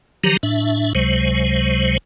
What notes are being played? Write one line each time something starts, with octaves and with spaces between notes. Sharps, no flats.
D#3 F3 F#3 G4 A#5
A2 D4 E5
C#2 C3 F#3 G#3 C5